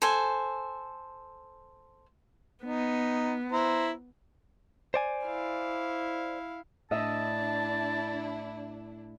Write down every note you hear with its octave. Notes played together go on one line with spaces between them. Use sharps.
A4 C5 G#5
B3 D#4
E4 C5 A#5
C5 D5 G#5
E4 F5
A2 D4 E4 D#5 E5 A5